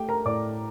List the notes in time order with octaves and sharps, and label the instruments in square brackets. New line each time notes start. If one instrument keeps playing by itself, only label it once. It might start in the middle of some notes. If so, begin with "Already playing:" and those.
Already playing: [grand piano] A3 [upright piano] G4 G5
[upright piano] A#4 A#5
[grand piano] A2 [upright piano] D5 D6